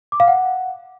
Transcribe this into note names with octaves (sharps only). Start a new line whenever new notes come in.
D6
F5
F#5